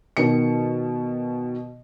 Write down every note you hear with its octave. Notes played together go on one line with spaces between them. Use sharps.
B2 D#3 C#7